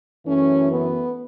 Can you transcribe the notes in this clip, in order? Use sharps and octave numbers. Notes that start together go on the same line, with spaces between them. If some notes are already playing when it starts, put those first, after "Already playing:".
F#2 E3 A3 C#4
B3